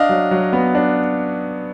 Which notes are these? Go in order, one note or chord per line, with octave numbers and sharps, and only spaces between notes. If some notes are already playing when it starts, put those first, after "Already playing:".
Already playing: D4 D#5 F5
F#3
F#3
B3
D4